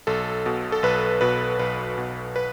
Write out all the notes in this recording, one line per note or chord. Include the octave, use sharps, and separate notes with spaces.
B1 A4
B2
A4
B1 B4
B2 B4
B1 B4
B2
B4